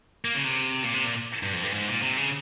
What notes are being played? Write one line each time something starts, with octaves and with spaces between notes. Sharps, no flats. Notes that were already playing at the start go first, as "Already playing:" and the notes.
A#3
C#3
C3
A#2
C3
A#2
G2
F2
G2
G#2
A#2
C3
C#3